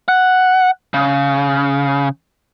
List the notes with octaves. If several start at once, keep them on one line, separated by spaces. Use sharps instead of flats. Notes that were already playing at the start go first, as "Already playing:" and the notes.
F#5
C#3